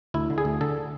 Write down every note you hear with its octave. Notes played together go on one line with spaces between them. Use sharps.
D2 E4
D3
G#4
D2
D3 A4